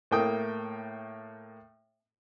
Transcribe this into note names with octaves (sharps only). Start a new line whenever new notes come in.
A2 A3 A#3 G5 D#6